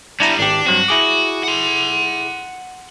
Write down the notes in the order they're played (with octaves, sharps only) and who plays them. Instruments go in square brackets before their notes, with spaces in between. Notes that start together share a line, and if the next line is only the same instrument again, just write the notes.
[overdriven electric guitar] G3 B3 [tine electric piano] D4 E4 A#5
[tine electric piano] G#1 G4 [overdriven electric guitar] D4
[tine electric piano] G2 F#3 C4 [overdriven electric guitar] F#4
[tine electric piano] E4 G#4 D6
[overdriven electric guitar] F#5 C6